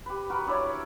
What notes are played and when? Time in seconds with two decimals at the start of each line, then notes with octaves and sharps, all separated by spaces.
0.06 G4 B4
0.30 F#4 A#4 B4
0.47 D4 E4 C#5 D5